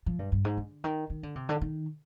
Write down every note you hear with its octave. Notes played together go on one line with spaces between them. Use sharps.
F3
G2
G2
G#2
D3
D#3
D#3
D3
C3
D3
D#3